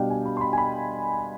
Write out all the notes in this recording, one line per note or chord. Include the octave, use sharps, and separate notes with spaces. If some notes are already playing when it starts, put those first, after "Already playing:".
Already playing: B2 G3 D4 F5 G5
G#5
B5
C6
B5
G#5
B5